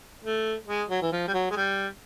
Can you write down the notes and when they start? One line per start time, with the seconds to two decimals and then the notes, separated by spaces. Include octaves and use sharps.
0.23 A3
0.67 G#3
0.90 F#3
1.01 E3
1.12 F3
1.27 G3
1.34 F#3
1.50 G#3
1.56 G3